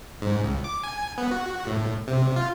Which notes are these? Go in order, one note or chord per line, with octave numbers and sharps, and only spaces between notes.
G#2
C#2
D6
G#5
B3
F#4
A2
C3
F4